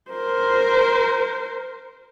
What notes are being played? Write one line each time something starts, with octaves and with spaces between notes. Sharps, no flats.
A#4 C5